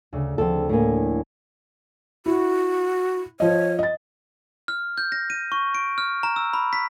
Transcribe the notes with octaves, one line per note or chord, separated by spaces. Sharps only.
D2 C#3
D2 F3 C4 A4
A2 A#3 D4 G#5
E4 F#4
F3 C#5 D#5
D#5 A6
F6
G6
A#6
D#7
C#6
D7
F6
A#5
E6
B5
B6